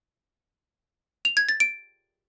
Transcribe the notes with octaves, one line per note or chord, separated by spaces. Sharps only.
F7
G#6
A6
D7